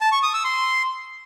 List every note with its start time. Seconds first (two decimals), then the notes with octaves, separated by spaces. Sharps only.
0.01 A5
0.12 C#6
0.23 D#6
0.34 E6
0.44 C6